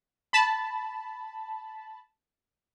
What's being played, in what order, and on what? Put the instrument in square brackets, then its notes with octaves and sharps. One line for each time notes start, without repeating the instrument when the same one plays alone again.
[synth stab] A5 B5